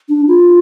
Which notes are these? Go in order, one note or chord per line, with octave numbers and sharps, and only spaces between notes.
D4
F4